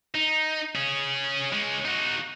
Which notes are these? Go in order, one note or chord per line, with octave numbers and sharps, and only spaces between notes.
D#4
C#4 G#4
G#3 C#4
D#4 F#4